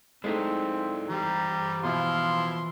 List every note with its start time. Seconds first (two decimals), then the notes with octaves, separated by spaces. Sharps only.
0.24 G#3 A3 C4 D#4 E4 A4 D5
1.09 E3 G3 C5 G5 A#5
1.84 B2 F3 E4 F5 C6